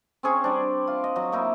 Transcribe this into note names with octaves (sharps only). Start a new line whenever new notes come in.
C4 C#4 G#4 C#5
G3 D4
F4
D#5
F#3
A#3 D#4 E4